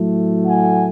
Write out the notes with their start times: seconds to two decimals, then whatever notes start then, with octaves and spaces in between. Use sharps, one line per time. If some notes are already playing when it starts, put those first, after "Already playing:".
Already playing: A2 F#3 A3
0.46 F#5 G#5